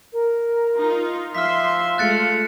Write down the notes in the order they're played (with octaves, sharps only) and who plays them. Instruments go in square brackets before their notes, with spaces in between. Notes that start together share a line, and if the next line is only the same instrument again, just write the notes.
[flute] A#4
[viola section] D#4 F4
[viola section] F3 E5 C6 [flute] F5 [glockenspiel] F6 B6
[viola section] G#3 A3 F4 [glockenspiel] F#6 A6 C#7